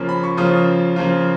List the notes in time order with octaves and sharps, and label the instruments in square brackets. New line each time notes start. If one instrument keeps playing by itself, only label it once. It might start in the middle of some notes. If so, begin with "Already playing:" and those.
Already playing: [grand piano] C#3 F3 A#3 C#4 F4
B5
C#6
C#3 F3 A#3 C#4 F4 D#6
C#3 F3 A#3 C#4 F4